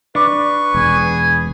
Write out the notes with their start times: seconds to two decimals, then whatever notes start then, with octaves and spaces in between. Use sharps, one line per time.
0.15 D4 B4 C#6
0.74 E1 G#4 G#5